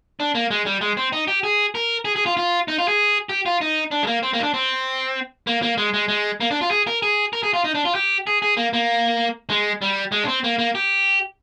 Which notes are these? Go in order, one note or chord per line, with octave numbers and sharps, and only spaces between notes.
D4
A#3
G#3
G3
G#3
C4
D#4
G4
G#4
A#4
G#4
G#4
F4
F4
D#4
F4
G#4
G4
F4
D#4
D4
G#3
A#3
C4
A#3
D#4
D4
C4
A#3
A#3
G#3
G#3
G#3
A#3
D4
F4
G#4
A#4
G#4
A#4
G#4
F4
D#4
D4
F4
G4
G#4
G#4
A#3
A#3
G#3
G3
G#3
D4
C4
A#3
A#3
G4